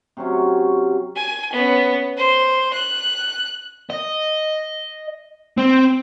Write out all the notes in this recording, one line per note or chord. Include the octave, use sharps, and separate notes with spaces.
C3 F#3 C#4
G#5
B3 C#4
C5
F#6
D#5
C4